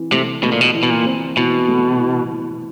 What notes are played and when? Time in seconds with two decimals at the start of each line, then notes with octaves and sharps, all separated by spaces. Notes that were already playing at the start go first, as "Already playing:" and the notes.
Already playing: E3 C4
0.12 C3 A3
0.43 B2 A3
0.52 A#2
0.61 B2
0.75 E3
0.83 B2
0.90 A#2
1.06 C4
1.37 B2 E3
1.68 A3
2.00 E3
2.31 E3